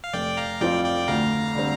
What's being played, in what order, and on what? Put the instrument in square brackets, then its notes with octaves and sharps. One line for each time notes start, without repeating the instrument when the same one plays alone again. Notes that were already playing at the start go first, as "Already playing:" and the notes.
[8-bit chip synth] F5
[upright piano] F1 [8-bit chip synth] D5 G5
[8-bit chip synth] F5 A#5
[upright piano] F2 F3 C4 F4 [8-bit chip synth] D5 G5
[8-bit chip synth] D5 G5
[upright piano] D2 [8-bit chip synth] F5 A#5
[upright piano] D3 G3 C4